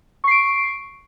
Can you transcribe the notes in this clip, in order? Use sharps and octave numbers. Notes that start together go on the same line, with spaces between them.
C#6 C7 D7